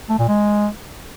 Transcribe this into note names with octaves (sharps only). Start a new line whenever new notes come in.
A3
A#2
G#3